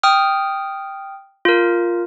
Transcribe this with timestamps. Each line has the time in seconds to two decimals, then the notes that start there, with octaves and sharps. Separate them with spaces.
0.03 G5 D#6 F6
1.45 F4 A#4